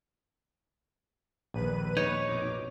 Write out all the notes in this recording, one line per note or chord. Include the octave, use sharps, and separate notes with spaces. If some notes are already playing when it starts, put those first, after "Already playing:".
A#1 D#2 B4 D#7
D#4 C#5
F2 B2 D6